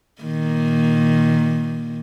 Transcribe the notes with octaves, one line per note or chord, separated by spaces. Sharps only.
A#2 D#3 A#3